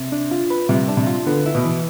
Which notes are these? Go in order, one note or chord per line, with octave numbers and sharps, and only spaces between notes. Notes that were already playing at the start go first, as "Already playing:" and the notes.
Already playing: C3
D4
F4
B4
C3 G3
D4
C3
F4
D3 B3
E4
B2
E3